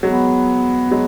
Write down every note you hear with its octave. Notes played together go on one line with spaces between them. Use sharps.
F#3 G#3 B3
F#3 G#3